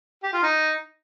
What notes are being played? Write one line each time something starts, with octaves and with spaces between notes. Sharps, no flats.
G4
F4
D#4